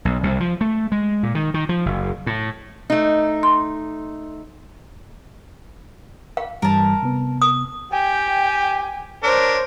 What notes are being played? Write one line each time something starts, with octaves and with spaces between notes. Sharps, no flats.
B1
C2
F3
A3
G#3
A#2
D#3
D#3
F3
F#1
A2
A3 D#4
C6
F5
G2 E3 G3 A#4 A5
C3 B3
D#6
G4 G5 G#5
D4 A#4 C5 C#5